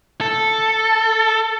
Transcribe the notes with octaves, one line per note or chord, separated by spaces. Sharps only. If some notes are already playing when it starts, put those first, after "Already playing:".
A4